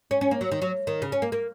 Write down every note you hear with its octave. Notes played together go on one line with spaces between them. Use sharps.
C#4
C#4
A#3
F#3
D#3
F#3
D#3
C#3
C#4
A#3
A#3